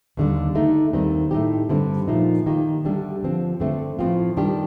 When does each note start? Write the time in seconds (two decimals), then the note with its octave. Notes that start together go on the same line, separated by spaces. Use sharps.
0.17 D#2 D3 G3
0.55 D3 A3 D#4
0.93 D#2 D#3 G3 C4 D#4
1.31 A2 A3 D#4 G4
1.69 G2 D3 G3 C4
2.08 A#2 F3 A3 D#4
2.46 D#3 A#3 D#4 G4
2.85 D2 D3 G3 D4 G4
3.23 D3 F3 C4
3.60 D3 A3 C4
3.99 A2 F3 C4 F4
4.37 D#3 G3 D4 G4